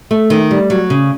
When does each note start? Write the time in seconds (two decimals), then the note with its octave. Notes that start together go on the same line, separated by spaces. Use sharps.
0.11 A3
0.30 D#3
0.51 G3
0.70 F#3
0.90 C#3